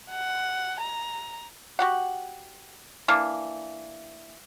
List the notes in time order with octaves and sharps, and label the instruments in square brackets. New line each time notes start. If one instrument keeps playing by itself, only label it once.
[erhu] F#5
A#5
[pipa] F#4 G4 F#5
E3 A#3 D4